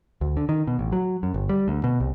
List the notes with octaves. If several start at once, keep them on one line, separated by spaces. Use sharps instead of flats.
D2
D3
D#3
B2
A1
F#3
F#2
G1
G3
D2
B2
C2